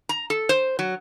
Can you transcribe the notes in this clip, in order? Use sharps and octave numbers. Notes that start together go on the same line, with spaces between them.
A#5
A4
C5
F#3